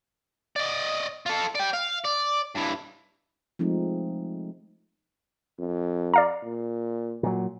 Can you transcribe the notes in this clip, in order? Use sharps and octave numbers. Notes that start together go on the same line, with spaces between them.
D5 D#5
F4 A4
D5 G5
F5
D5
G2 E3
F3 G#3 A3 C4 D#4
F2
D5 F5 A#5
A#2
A#2 F#3